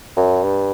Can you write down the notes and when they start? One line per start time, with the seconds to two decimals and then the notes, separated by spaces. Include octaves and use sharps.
0.17 F#2
0.43 G2